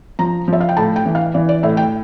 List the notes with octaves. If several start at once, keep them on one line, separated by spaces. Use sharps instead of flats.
F3 A#5
F3 E5
F5
G5
A2 A5
G5
E3
F5
E3 D5
D5
A2 E5
G5